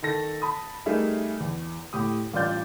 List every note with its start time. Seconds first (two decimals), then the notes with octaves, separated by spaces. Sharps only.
0.03 D#3 A4 A#6
0.42 A5 B5 D#6
0.86 G3 A3 D#4 G#4 A#4 E5
1.40 E2
1.93 A2 G4 D#6
2.34 A1 G2 F4 D5 G6